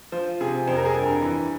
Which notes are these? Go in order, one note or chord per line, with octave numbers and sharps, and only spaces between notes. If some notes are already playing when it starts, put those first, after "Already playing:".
F3 C5
C3 G#4
F2 C5
A#4
G#4
G2 A#4
E3